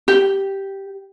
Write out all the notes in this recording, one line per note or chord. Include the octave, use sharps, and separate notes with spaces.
G4